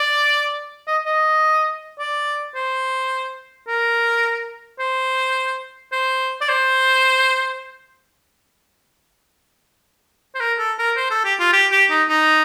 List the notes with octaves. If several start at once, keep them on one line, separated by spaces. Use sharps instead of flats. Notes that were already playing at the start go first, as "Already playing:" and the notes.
Already playing: D5
D#5
D#5
D5
C5
A#4
C5
C5
D5
C5
C5
A#4
A4
A#4
C5
A4
G4
F4
G4
G4
D#4
D#4